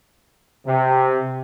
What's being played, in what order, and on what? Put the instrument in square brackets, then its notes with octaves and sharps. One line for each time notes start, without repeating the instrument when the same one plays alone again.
[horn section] C3